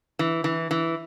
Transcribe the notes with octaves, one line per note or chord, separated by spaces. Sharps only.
E3
E3
E3